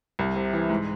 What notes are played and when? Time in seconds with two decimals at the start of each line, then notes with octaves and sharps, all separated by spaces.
0.19 C2
0.36 C3
0.53 E3
0.70 G#2